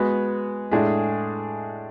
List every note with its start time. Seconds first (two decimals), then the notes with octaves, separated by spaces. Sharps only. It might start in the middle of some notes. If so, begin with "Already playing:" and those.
Already playing: G#3 B3 F#4
0.71 A2 G#3 D4 G#4